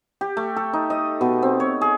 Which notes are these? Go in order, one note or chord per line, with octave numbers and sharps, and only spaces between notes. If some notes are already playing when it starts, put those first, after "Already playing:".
G4
A3
A4
D#4
D#5
B2
C4
C#5
G#4